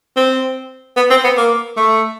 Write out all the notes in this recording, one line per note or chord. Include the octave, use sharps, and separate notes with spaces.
C4
B3
C4
B3
A#3
A3